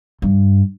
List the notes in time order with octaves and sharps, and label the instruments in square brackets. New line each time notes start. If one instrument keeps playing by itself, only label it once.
[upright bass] G2